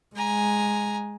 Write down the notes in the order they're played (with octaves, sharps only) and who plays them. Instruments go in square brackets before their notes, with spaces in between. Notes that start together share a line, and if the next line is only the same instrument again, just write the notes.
[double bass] G#3 [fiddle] G#5 A#5